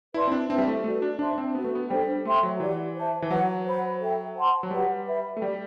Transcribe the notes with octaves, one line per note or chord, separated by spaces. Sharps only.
E4 B4 D5 A5 C6
C4
D4
C4 E4 B4 E5 A5
G3
A3
A3 D4 F#4 B4 D5
D4
D4 C5 E5 A5 C6
D4
C4
B3 D4 F#4 B4
A3
B3
G3 D4 A4 C5 G5
A3 C5 E5 G5 C6
F#3
E3 G4 D5 F#5
C5 E5 A5
E3
F#3 B4 F#5 B5
C5 F#5 B5
A4 E5 G5
C5 F#5 A5 C6
F#3
G3 G4 B4 F#5
B4 E5 B5
A3
G3 G4 D5 G5